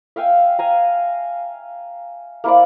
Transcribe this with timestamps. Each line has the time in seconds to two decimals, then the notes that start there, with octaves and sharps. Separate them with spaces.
0.16 E5 F5 G5 G#5
0.59 F5 G#5 A#5
2.44 A#3 E4 C5 D5